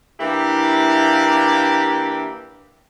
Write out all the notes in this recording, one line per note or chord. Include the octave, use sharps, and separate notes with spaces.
E3 A#3 D4 E4 G4